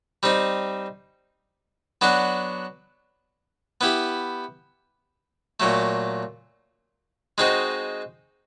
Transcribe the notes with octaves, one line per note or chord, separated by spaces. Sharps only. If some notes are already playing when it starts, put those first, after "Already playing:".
G3 C4 D#4
F#3 B3 D4 F#4
B3 E4 G4
A#2 F#3 A3
G#3 C4 D#4 F#4